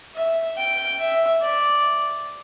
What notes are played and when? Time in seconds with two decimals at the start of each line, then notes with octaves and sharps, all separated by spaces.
0.15 E5
0.57 G5
0.99 E5
1.41 D5